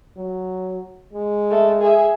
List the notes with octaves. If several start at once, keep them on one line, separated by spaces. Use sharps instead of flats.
F#3
G#3
A3
G#4 E5